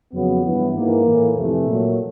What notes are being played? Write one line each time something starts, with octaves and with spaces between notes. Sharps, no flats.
F2 C#3 F#3 B3
G2 E3
G#2 E3 A#3
A2 E3
F2 C3 E3 A3
A#2 F#3